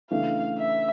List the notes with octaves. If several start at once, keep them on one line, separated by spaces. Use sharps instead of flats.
C#3 E3 A3 D4 F5
E5